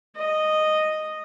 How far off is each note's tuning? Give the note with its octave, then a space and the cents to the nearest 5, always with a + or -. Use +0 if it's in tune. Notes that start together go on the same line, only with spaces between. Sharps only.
D#5 -5